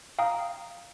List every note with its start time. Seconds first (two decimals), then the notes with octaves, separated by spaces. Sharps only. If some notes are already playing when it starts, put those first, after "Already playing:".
0.19 F5 G5 A#5 D#6